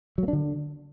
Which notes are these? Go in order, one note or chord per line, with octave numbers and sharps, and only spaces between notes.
F#3
A#3
D4
D3